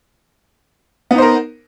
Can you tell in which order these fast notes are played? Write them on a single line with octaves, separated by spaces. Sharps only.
B3 D#4 C5 A#4